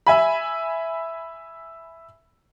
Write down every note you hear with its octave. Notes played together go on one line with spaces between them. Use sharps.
E5 G#5 B5